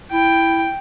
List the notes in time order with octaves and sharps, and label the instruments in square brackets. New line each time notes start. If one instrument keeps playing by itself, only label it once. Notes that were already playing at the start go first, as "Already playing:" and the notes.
[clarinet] E4 [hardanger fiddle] G5